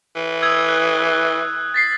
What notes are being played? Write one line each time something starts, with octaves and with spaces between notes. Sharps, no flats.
E3
D#6 E6 G#6
F#6
A6 B6 C7